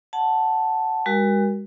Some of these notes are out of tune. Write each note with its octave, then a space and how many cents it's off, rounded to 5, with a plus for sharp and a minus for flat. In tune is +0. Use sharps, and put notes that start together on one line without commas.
F#5 +0 A5 +0
G#3 -40 F#4 +25 A#4 +20